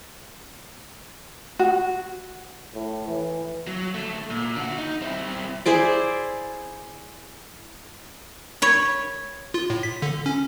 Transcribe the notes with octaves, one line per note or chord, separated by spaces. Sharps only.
F#4
A2
E3
F#3
D2 A3
A#2
D3 F#4
D#4
C4 E4
E4 G#4 C5 D5
C#5 B5
F4
A2
B6
D3
C#4